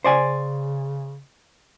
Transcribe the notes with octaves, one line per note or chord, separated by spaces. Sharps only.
C#3 C5 D5 G#5